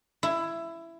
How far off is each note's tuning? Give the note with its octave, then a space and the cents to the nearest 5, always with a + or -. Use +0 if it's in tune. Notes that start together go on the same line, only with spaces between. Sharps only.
E4 +15